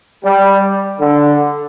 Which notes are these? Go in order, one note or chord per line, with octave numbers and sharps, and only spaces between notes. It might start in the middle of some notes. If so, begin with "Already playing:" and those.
G3
D3